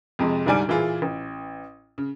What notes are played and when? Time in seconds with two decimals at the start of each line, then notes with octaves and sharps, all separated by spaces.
0.19 F2 C3 G#3
0.46 D2 G#2 G3 D5 G#5 D7
0.68 A#2 E3 E4 F4 G#4
1.02 A1
1.98 C#3